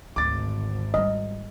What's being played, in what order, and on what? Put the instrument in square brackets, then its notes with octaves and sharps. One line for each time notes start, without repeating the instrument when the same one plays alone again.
[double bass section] G#1 [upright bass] D2 [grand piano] D6 A6
[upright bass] G3 D#4 [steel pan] D#5